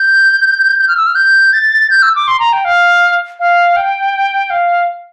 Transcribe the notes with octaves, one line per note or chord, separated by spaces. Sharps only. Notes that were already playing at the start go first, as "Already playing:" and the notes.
Already playing: G6
G6
F6
E6
F6
G6
A6
G6
E6
D6
C6
A#5
G5
F5
F5
G5
F5